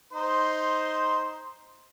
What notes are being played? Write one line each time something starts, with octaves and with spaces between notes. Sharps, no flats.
D#4 C5 C6